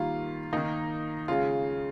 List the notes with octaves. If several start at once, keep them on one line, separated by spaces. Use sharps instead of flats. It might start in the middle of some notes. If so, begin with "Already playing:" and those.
Already playing: D#3 G3 A#3 F4
D#3 A#3 D#4
C#3 G#3 F4